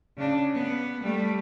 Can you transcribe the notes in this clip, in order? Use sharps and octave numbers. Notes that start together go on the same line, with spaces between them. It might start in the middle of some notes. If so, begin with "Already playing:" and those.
C#3 D4
B3
G3 A3